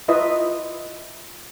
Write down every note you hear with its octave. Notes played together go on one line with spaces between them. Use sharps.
E4 F4 B4 D#5 E5